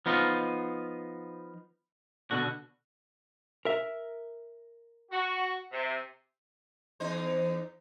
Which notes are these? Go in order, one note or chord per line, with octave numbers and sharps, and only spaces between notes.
F3 B3 D#4 F4
B2 D3 F#4
A#4 E5
F#4
C3
E2 D#4 C5